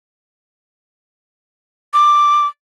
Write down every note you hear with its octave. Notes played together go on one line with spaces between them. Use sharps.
D6